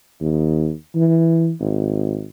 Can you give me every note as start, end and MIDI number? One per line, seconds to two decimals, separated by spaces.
0.20 0.72 39
0.95 1.51 52
1.60 2.26 32